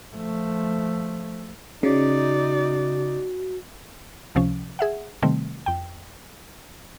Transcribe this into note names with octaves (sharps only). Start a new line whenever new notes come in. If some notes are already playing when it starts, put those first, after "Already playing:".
F3 A3
C#3 D#4 F#4 D5
C#2 C3 F3 C#4
G#4 E5 F#5
C3 D#3 G3 A3 C4
F2 G5